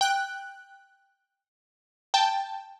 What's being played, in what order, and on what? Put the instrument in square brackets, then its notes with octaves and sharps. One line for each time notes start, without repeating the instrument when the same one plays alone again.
[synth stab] G5 F#6
G5 A5